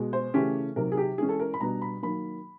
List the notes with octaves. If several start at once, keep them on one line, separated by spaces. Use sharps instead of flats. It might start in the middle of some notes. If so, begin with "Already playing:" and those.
Already playing: B2 G#3
C5
C#3 E3 A3 C#4 G4
C3 D#3 F#3 A#4
G#4
G4
E3 G#3 C#4 G#4
A4
A#4
B5
B2 G3 B3 D4 A#5
B5
D#3 F#3 A#3 B5